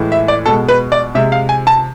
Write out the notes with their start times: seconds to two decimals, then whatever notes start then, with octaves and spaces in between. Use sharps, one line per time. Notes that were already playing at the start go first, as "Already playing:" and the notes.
Already playing: A2 E3 G#3
0.12 E5
0.28 D5
0.46 B2 G#3 A4
0.68 B4
0.92 D5
1.15 C3 G#3 E5
1.32 F5
1.49 G#5
1.67 A5